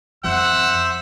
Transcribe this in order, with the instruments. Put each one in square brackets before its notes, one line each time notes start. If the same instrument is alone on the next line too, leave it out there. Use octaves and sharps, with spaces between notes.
[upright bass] F2 [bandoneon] C5 E5 [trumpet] F#5 [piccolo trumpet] E6